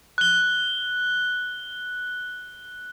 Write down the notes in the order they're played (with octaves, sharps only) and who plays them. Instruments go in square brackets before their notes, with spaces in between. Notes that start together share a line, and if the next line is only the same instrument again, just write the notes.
[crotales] F#6 G7